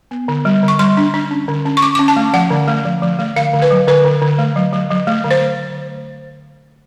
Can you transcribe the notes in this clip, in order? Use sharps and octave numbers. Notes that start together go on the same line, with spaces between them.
B3
D3
G3
D3
C#6
G3 C6
D4
D4
C#4
D3
C#4
C#6
C#4 D6
C#4 D6
A5
A3
F3 F#5
D3
A3
F3
F3
A3
D3 F5
D3
B4
F#3
D3 B4
D3
D3
A3
F#3
F#3
F#3
A3
D3
C5